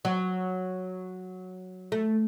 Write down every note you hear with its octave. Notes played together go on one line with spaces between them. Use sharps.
F#3
A3